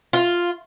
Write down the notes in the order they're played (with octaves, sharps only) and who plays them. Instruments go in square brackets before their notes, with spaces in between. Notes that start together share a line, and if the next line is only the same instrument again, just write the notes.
[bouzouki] F4